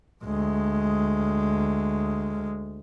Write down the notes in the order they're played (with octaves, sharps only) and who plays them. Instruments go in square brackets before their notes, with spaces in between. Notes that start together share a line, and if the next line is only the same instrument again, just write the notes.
[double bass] D2 G#3